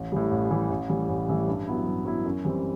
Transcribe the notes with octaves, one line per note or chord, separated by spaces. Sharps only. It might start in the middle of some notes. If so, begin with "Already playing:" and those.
Already playing: A1
A2 E3 G3
A1
A2 E3 G3
A1
A2 E3 G3
A1
A2 E3 G3
G2
F#3 B3 E4
G2
F#3 B3 E4
F#2
E3 G3 C4